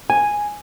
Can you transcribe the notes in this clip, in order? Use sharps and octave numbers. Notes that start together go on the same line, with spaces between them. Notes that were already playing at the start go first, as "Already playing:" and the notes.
G#5